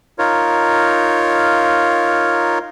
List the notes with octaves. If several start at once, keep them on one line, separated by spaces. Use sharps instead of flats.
D#4 F4 A#4 C#5